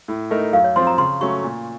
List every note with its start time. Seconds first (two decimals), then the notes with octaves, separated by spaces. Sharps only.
0.08 A2
0.31 A3 D#4 A#4
0.53 F#2 F5
0.64 C#5
0.76 F3 C4 F4 C5 C6
0.87 A#5
0.98 C#3 C6
1.21 F#3 A3 C#4 C#6
1.43 A#2